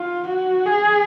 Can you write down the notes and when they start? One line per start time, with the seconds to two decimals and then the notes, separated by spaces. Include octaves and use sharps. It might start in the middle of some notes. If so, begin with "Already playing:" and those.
Already playing: F4
0.27 F#4
0.66 G#4